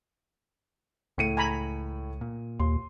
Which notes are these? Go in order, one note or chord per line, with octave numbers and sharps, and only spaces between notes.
C#2 A2 C#7 D#7
G#5 A#5 B5
A#2
D#2 C6